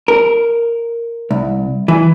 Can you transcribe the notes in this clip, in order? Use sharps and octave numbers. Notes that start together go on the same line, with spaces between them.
A#4
C2
E3